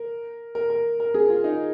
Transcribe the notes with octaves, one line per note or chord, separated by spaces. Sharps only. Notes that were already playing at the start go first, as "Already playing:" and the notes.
Already playing: A#4
A#4
A#4
A#4
G#4
F4
D#4